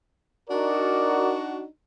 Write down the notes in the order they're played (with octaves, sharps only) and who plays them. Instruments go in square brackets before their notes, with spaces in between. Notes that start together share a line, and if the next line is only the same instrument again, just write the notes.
[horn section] D4 D#4 F#4 [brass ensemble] A#4 D5 D#5